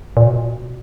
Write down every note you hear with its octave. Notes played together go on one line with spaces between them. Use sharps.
A#2
B2